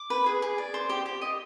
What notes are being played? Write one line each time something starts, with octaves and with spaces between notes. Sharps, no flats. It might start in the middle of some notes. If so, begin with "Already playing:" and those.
Already playing: D6
B4
G#4
G#4
D5
C5
G4
G4
D#5